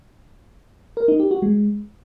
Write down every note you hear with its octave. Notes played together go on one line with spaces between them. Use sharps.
A#4
D#4
G4
F#4
G#3